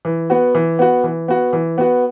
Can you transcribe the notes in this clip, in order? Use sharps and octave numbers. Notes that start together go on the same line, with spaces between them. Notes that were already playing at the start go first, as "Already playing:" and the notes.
E3
B3 F#4
E3
B3 F#4
E3
B3 F#4
E3
B3 F#4